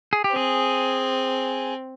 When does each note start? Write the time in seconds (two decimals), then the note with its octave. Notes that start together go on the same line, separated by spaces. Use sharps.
0.13 G#4
0.24 G4
0.32 C4 G#4